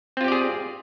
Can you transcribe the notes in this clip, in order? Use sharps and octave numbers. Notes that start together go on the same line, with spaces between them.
C4 F4 G4 G#4 D5